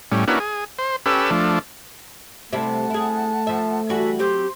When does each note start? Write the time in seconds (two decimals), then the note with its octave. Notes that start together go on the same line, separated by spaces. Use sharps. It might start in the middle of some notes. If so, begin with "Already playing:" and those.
0.12 A2 G3 C#4
0.28 A#3 C#4 D4 E4 F#4 B4
0.40 G#4
0.79 C5
1.06 C#4 G4 A4 B4 E6
1.31 F3 A3 D4
2.53 C3 G3 A3 E4 F#5 A5
2.90 E4 G#4
3.47 F3 E5
3.89 E3 G3 F#4 A4 E5 G#5
4.19 F#3 C4 G4 C5